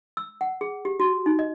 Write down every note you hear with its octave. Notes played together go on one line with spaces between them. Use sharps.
E6
F#5
G#4
G4
F#4
D#4
D#5